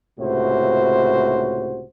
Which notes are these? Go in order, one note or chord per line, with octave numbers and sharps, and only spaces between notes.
C#2 A2 C3 F#4 C5